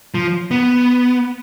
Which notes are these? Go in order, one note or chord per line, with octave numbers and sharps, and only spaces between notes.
F3
B3